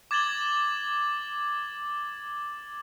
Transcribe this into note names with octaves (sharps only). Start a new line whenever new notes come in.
D6 G#6 A6 E7 F#7 G7